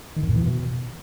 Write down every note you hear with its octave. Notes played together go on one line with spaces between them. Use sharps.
D#3
F2
A#2
E3
B2